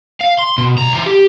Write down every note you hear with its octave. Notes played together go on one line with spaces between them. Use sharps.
F5
C6
B2
C2 A#5
E3 C5
G4